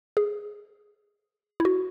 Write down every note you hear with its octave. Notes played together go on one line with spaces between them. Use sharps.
G#4
E4
F#4